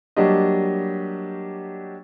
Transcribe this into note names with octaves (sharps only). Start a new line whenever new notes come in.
F#3 G3 A#3 D4 G4 D#5